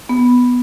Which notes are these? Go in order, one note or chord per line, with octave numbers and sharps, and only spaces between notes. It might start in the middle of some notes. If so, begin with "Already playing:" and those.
B3